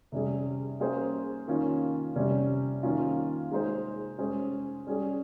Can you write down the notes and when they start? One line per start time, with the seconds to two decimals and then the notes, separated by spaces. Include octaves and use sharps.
0.12 C3 G3 C#4 G#4
0.80 A#3 C#4 G#4 C5
1.47 D#3 A#3 C#4 F4
2.16 C3 G3 C#4
2.83 D#3 A#3 C#4 F4
3.51 G#3 D#4 G#4 C5
4.18 G#3 C#4 G#4 C5
4.87 G3 C#4 G#4